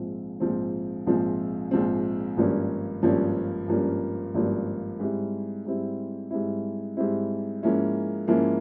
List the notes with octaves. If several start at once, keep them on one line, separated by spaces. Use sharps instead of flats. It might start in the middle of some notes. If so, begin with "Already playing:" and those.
Already playing: A#1 G#2 F3 C4
A#1 G#2 F3 C4
A#1 G#2 F3 C4
A#1 G#2 F3 C4
G#1 G2 F3 A#3 C#4
G#1 G2 F3 A#3 C#4
G#1 G2 F3 A#3 C#4
G#1 G2 F3 A#3 C#4
G#2 G3 C4 E4
G#2 G3 C4 E4
G#2 G3 C4 E4
G#2 G3 C4 E4
G#2 F3 A#3 C#4 E4
G#2 F3 A#3 C#4 E4